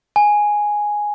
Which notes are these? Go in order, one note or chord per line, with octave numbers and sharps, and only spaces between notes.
G#5